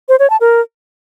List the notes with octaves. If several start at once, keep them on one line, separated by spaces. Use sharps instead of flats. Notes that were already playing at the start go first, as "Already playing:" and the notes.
C5
C#5
A5
A#4